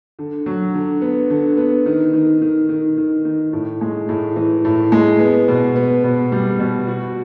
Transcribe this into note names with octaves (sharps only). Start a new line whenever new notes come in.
D3
F#3
D3
B3
D3
B3
D#3
D#3
D#3
D#3
D#3
D#3
A2
G#3
A2
E3
A2
G#3
B3
B2
B3
B2
G3
B2
F#4